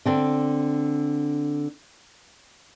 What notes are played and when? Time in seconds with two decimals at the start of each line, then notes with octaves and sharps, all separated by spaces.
0.06 D3 C4 D4